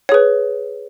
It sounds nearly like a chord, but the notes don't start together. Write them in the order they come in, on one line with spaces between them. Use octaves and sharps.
C#5 G#4 B4